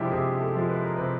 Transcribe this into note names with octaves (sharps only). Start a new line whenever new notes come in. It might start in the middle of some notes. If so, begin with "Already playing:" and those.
Already playing: C3 F3 G#3 D4 E4 G4
C3 G#4
A4
F3 G#3
B4
A#4
C3 B4